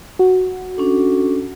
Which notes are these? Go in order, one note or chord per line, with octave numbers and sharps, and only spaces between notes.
F#4
C#4 D4 A4